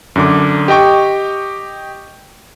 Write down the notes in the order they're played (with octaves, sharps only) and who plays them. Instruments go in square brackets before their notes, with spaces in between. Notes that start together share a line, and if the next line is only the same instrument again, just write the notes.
[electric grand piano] F#2 D3 D6
G4 D#5 G5 C#6